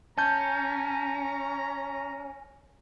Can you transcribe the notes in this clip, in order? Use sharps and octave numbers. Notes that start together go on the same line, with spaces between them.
C#4 A5 A#5 G6